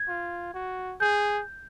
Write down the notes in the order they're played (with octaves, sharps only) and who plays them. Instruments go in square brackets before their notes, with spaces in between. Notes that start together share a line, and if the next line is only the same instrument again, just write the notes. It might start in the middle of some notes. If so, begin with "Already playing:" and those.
Already playing: [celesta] G#6
[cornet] F4
F#4
[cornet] G#4 [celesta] G6